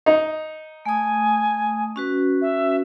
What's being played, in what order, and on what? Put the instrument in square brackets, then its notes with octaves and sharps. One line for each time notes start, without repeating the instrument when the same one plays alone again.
[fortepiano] D#4
[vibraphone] A3 D#6 [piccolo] G#5
[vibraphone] C#4 F#4 B4
[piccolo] E5